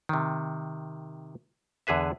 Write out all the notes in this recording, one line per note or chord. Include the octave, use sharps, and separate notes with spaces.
C3 D#3
E2 D3 G#4 B4 E5